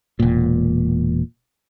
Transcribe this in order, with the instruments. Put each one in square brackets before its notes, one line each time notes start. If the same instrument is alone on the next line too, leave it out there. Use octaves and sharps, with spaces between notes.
[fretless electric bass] E1 A#2